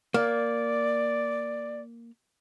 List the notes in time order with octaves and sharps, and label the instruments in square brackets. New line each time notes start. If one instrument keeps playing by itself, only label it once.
[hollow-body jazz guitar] A#3 [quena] D5